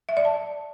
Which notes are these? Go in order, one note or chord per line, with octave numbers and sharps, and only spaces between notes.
E5
D5
A5